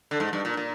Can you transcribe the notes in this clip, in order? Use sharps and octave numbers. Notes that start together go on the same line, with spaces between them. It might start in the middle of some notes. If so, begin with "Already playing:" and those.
D3
G#2
G2
A#2
A#2